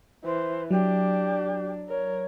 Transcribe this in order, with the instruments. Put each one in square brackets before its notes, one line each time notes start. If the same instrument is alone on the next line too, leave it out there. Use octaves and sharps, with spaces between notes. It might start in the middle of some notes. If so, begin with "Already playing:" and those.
[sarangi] E3 [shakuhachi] C5
[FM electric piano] F#3 [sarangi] D4 [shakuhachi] G4
[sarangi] A#4 [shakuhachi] C#5